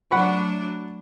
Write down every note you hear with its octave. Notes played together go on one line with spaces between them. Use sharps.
F#3 A3 D4 F#5 B5 C#6